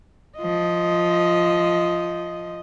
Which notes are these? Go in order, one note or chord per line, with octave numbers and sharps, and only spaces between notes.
F3 D#5